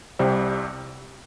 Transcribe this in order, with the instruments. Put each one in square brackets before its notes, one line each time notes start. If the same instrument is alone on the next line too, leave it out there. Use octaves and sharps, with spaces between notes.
[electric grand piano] C2 C3 G3 C4